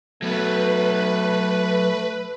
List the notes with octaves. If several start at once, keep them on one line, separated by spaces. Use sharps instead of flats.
F#3 A3 B3 B4